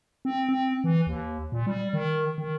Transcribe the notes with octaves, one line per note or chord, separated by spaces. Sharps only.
C4
C4
E3
D#2
A#2
G3
D#3
D#3